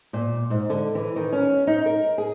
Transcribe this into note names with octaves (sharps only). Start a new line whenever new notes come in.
A#2
G#2
D3
E3
D#3
C#4
D#4
A#4
G#4